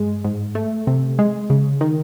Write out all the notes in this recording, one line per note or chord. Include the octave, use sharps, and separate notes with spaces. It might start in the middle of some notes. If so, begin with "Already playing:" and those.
Already playing: G2 G#3
G#2
A3
C3
G#3
C#3
D#3